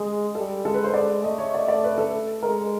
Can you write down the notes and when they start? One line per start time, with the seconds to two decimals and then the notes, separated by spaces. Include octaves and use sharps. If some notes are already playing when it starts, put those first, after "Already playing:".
Already playing: G#3 G#4
0.35 G3 A4
0.65 G#3 A4
0.74 B4
0.84 C5
0.94 G#3 D5
1.24 A3 D#5
1.39 C#5
1.54 D5
1.68 D5
1.84 B4
1.98 A4
2.42 G#3 A#4